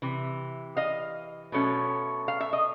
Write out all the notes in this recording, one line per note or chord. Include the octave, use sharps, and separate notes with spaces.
C3 E3
D#5 F5
B2 F#3 A3 C#4
F5
E5
D#5